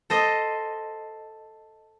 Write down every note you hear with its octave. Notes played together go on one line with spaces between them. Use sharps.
A4 C5 D#5